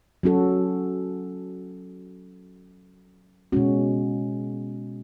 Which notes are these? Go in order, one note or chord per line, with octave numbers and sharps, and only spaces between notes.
F#3 C#4 F#4 A4
B2 G#3 C#4 F#4